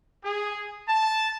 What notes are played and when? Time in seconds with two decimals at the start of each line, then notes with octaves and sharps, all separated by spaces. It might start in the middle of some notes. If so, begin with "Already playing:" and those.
0.24 G#4
0.88 A5